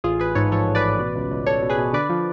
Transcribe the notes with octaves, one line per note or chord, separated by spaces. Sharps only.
A1 F4 G#4
A1 G#4 B4
G#2 A4 C#5
F3 A4 C#5
A1
B4 D5
A1
B2
C#2
C#2
C#2 A4 C#5
B2
G#4 B4
B2
D3 B4 D5
F3